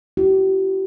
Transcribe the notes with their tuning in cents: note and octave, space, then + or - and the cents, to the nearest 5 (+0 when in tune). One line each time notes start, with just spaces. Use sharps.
E4 +40 G4 -40